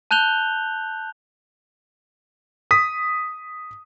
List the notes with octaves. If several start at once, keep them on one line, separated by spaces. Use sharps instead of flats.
A5 F#6 G6 F7 G7
D#6 B6